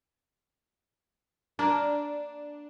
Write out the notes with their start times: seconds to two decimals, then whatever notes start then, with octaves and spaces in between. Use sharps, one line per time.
1.59 A#3 D4